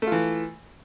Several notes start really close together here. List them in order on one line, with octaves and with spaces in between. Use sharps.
A3 F4 E3